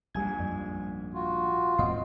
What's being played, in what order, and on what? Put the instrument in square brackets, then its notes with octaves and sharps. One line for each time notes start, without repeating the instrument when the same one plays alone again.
[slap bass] A#1 G#2 [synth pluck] G3 G#5 G#6
[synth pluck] F#2
[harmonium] F4 F#4
[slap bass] G#2 F3 C4 [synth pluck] D#5 F5 C6